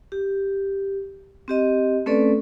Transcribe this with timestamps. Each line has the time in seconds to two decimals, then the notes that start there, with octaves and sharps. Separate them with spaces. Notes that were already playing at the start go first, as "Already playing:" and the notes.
0.12 G4
1.48 C4 G4 D#5
2.06 A3 C4 C#4 A4 B4 D5